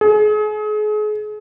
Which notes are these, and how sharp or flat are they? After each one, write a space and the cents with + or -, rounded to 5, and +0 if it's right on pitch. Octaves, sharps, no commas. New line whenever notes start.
G#4 +35